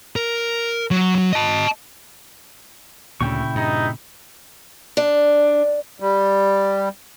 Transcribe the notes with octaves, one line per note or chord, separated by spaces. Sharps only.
A#4
F#3
F#3 F#4
D#5 A5
D2 A#2 C#3 E4 G5 C#6
G2 D#4
D4
G3